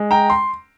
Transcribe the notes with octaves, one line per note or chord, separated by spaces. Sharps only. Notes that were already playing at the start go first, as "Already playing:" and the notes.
Already playing: G#3
G5 A#5
C6